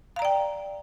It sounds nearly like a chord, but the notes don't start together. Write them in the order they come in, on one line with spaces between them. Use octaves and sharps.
F5 A#5 D5 G5